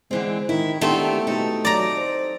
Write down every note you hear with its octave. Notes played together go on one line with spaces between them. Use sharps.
D3 E3 G#3 C4
D#3 E4
D#3 A3 B3 C4 D4 G4
B2 D#4 A4
F#3 D5 A#5
C5